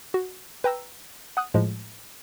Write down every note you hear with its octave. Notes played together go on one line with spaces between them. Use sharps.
F#4
B4 G5 A#5 E6
F#5 D#6 F#6
A2 F3 G#3